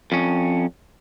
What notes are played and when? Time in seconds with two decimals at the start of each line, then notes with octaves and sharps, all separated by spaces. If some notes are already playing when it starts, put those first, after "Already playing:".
0.12 F2 C#4